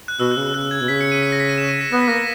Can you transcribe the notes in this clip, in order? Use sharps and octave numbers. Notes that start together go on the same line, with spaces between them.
F#6
B2 E6
F#6
C#3
C#3 F#6
G#6
B2
C#3 B6
C#7
D#7
B6
A#6
B6
D#7
E7
D#7
B6
B3 A#6
B6
A#3 A#6